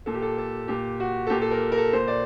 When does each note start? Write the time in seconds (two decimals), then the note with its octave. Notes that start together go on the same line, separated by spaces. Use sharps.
0.06 A#2 A4
0.14 G4
0.22 A4
0.38 A4
0.68 A#2 G4
1.00 F#4
1.27 A4
1.30 A#2 G4
1.41 A4
1.51 A#4
1.72 A#4
1.78 A4
1.93 A#2 C5
2.08 D5